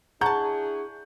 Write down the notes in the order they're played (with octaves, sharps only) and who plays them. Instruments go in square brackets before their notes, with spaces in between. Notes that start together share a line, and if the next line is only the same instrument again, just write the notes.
[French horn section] D4 E4 G#4 [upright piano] F#5 C#6 G6 [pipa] A5 A#5